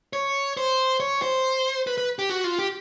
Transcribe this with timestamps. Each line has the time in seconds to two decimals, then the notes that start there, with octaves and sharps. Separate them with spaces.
0.13 C#5
0.57 C5
1.00 C#5
1.22 C5
1.87 B4
1.98 B4
2.19 G4
2.30 F#4
2.44 F4
2.59 G4